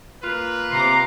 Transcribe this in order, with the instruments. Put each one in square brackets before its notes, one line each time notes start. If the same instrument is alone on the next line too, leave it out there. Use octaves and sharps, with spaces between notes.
[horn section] A#3 F4 B4
[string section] C3 A#5 D6 [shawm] C6